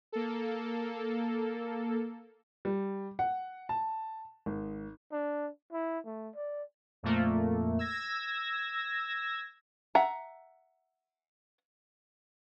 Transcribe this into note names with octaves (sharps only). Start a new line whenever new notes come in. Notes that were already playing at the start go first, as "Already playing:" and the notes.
A#3 A4
G3
F#5
A5
G#1
D4
E4
A3
D5
F2 A#2 A3 A#3
E6 G#6 A#6
E5 F#5 A#5